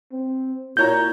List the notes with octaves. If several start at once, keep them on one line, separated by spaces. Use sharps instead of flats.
C4
A#2 E4 F#4 C#5 A#5 G6